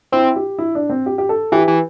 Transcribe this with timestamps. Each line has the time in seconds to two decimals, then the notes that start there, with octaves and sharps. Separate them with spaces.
0.12 C4 E4
0.36 G4
0.58 E4
0.75 D4
0.89 C4
1.06 G4
1.18 G4
1.29 A4
1.52 E3 G4
1.68 E3